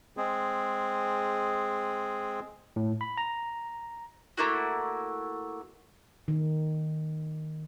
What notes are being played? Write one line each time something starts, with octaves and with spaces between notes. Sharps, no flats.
G#3 C4 G#4
A2
B5
A#5
A3 A#3 E4 F#4
D#3